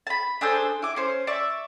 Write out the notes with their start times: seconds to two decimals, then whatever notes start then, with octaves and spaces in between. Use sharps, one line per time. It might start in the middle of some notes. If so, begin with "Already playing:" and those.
0.07 A5 B5
0.41 D4 G#4 A4 C5
0.82 E4 D6
0.96 C#4 C5
1.27 D5 E5 C#6